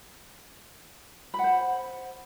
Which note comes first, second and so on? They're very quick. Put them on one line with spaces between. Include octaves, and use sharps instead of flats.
B5 F#5 C5